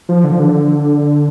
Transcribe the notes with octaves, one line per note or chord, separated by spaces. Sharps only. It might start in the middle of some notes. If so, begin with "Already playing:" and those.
F3
D3
F3
D3